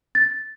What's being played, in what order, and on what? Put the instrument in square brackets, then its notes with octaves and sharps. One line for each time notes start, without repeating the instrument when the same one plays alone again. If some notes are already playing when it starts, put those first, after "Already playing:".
[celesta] A6